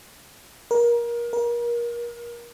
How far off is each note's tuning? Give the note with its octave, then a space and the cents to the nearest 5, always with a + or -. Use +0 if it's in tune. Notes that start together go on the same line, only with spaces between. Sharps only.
A#4 +25
A#4 +30